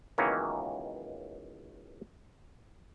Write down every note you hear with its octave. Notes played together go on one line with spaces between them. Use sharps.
C#2 B2 D#3 E3 A#3 C#4